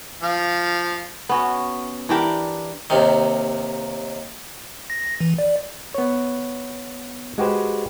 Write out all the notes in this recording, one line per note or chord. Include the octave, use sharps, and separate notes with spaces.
F3 F5
B3 C#4 F#4
E3 D4 G4 A#4
D#2 C3 D#3
A#6
E3
D5
B3 C#5
G#3 F#4 G4 B4 C5